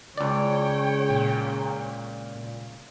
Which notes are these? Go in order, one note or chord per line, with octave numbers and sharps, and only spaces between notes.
C#2 C#3 C#5 D5 G5
A#2